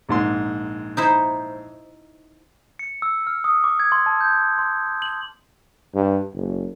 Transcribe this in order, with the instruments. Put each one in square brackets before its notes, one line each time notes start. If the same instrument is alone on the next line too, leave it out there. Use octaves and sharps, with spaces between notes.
[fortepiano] A#1 G#2 C6
[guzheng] D#4 E4 C5
[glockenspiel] C#7
E6
F6
D#6
D6
G#6
C6
A5
G6
C6
F#7
[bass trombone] G2
F#1